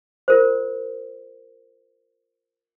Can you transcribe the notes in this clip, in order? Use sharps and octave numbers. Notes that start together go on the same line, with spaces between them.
F4 A#4 C5